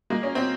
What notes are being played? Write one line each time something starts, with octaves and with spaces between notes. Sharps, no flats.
G#3 A#3
C#4
C4